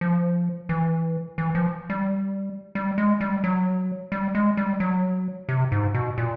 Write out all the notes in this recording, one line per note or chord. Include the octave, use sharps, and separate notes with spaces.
F3
E3
E3
F3
G3
G3
G#3
G3
F#3
G3
G#3
G3
F#3
C3
G#2
B2
A#2